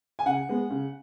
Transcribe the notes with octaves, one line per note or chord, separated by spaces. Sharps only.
G#5
C#3 F#5
G#3 B3
C#3